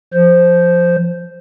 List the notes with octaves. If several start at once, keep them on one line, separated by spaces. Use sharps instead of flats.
F3 C5